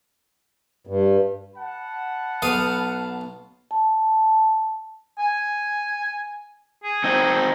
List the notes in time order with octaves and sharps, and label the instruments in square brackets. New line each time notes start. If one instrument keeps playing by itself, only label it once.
[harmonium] G2
[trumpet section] F#5 A5 B5
[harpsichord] B1 F5 D#6
[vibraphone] A5
[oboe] G#5
G#4
[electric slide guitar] C4 D#4